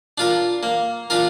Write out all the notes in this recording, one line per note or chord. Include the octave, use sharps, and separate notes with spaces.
D4 F4 A#4
A#3
D4 F4 A#4